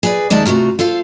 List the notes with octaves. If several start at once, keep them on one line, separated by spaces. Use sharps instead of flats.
G#4 B4 D5
D#2 G#3 D#4 D5 E5 A5
C3 A3 F4 F#4 A#5
F4 A4 C5 F5